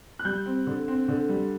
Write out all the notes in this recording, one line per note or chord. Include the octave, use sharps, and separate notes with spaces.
F#6
G3 G6
C4
D3
C4
D3
G3